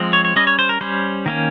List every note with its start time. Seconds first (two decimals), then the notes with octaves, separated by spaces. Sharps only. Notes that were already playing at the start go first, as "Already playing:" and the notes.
Already playing: F3 G#3 C4
0.13 C#5
0.25 C#5
0.36 G3 C#4 D#5
0.47 C#5
0.59 C5
0.69 A#4
0.81 G3 C#4 C5
1.26 D#3 A#3 C#4